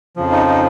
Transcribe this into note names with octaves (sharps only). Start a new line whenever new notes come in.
F2 C#3 F3
D#4
D#4